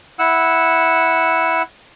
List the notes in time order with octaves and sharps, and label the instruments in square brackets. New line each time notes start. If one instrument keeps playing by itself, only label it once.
[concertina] E4 F#5 E6